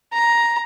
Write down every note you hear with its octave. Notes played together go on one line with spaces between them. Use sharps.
A#5